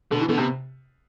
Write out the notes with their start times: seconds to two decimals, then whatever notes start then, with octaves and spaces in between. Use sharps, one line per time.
0.11 B2 D3
0.20 E3
0.29 B2 D3
0.38 C3